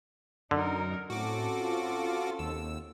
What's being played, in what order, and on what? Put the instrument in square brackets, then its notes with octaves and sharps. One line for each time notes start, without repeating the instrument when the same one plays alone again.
[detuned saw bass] F#2 [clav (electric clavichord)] D3 [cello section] D#4 A#4
[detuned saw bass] A2 [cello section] C4 C#4 A4 [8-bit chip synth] F#4 D6
[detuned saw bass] F4
[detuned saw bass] D#2 [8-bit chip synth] E6